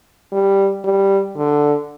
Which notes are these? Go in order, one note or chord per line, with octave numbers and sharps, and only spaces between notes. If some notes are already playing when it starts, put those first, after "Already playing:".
G3
G3
D3